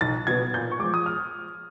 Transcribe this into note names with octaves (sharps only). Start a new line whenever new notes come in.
B1 A6
B2 F#3 B3 G#6
A#2 G6
C#6
F3 G#3 D6
D#6
F6